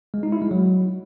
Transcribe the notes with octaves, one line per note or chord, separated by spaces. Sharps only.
G#3
D#4
E4
G#3
F#3